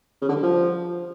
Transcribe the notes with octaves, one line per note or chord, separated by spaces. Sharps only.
C#3
D3
G2
F3